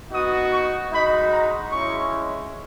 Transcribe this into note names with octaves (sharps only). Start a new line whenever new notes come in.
B3 D#4 F#4 D#6
C#6
G#3 D#4 F#4 B5
A#5
G#3 C#4 E4 C#6